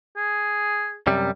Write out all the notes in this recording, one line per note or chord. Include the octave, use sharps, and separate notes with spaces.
G#4
F#2 C3 G3